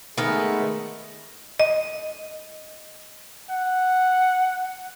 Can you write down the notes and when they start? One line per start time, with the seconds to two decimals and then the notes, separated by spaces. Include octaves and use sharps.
0.18 D#3 G#3 A3 B3 G#4
1.60 D#5
3.50 F#5